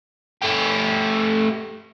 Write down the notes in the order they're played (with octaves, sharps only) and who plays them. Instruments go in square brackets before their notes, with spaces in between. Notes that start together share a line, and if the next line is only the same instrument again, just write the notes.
[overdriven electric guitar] A3 G4